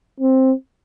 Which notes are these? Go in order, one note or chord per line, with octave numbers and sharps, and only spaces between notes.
C4